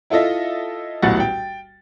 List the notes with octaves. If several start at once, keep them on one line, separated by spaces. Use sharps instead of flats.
E4 F4 A4 D#5 E5
D#1 B1 A2 F#5 A6
G5